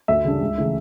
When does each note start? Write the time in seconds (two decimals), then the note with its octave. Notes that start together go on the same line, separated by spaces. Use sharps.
0.08 D2 E5
0.25 C#3 G3 D4
0.40 C#2
0.58 C#3 E3 A3